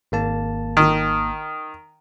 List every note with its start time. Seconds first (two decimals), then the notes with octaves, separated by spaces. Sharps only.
0.12 G#1 A#3 A5
0.77 D#3